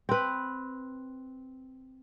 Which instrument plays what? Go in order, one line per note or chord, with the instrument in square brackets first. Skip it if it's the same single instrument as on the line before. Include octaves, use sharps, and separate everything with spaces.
[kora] C4 B4